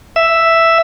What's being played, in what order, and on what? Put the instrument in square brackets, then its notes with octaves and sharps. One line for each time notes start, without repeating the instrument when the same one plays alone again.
[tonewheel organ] E5